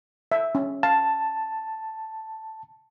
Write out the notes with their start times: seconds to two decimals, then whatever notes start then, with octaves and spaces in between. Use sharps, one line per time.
0.32 E5
0.55 C#4
0.83 F5 A5